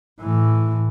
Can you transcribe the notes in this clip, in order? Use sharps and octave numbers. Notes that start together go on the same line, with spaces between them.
A2 E3